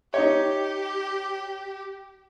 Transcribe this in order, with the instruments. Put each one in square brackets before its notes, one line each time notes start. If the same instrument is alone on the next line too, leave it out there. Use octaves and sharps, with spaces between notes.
[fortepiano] D#4 C#5 [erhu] G4